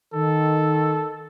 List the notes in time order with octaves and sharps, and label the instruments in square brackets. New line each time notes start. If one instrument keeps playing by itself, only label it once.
[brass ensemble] D#3 [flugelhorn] A4